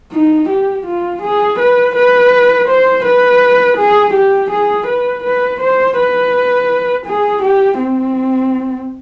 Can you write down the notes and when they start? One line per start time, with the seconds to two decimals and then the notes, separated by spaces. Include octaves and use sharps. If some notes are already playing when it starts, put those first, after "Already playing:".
0.13 D#4
0.49 G4
0.86 F4
1.22 G#4
1.59 B4
1.95 B4
2.68 C5
3.04 B4
3.77 G#4
4.13 G4
4.50 G#4
4.86 B4
5.23 B4
5.60 C5
5.97 B4
7.06 G#4
7.42 G4
7.80 C4